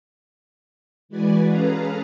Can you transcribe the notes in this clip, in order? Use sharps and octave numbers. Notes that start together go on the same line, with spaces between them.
E3 G#3 F#4 B4 D5 G#5
C#4 G#4 A4 B4 F5 A#5